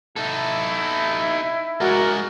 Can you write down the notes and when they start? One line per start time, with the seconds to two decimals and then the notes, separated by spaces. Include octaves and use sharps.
0.16 D#4 E4 A4
1.81 G#3 F#4 A#4 D5